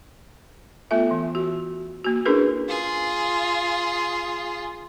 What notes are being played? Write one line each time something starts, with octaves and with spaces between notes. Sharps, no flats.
A3 B3 F4 A4 E5
E3
F#4
A#3 F#4
C#4 D4 E4 G#4 A#4 B4
F4 G#4